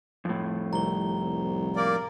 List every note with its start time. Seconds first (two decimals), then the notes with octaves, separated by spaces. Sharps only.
0.25 F2 A2
0.73 C2 A#5 G7
1.76 A#3 A#4 D5